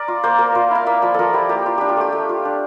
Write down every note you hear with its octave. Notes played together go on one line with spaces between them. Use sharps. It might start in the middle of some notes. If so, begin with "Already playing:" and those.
Already playing: A#4 D5
F4
A#3 C5
A#3 A#4
F4 D5
E4 F5
A#3 E5
F3 D5
F3 A4 A#4
E4 G4
A#3 G4
F4
D4 G4
F4
A3 G4
A3
F4
D4